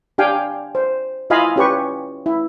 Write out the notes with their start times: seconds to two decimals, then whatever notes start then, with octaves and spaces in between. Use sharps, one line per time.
0.18 D4 G4 F5 G5 G#5
0.75 C5
1.30 E4 F4 D#5 F5 G#5 B5
1.56 C#4 G4 B4 C#6
2.26 E4